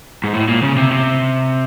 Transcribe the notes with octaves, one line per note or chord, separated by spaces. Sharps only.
G#2
A2
A#2
C#3
C3
C3